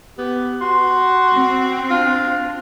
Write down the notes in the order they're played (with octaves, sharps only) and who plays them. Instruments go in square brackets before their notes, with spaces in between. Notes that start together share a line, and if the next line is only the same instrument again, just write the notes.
[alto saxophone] B3 [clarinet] G4
[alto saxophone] F#4 [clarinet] C6
[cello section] C4
[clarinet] D4 [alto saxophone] F4